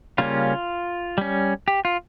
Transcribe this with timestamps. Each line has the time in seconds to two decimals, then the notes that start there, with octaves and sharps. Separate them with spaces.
0.18 C#3 G3 A#3 C#4 F4
1.18 G3 C#4
1.68 G4
1.85 F4